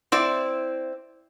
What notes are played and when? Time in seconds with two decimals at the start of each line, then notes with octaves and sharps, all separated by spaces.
0.12 C4 E4 D5